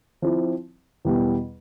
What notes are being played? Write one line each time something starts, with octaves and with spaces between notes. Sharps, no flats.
F3 C4 E4
E2 B2 G3